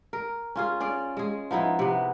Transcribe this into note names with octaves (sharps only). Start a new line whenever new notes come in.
A#4
C#4 F4 G#4
C#4 G#4 D5
G#3 G#4
F3 B3 D#4 E4
C3 B3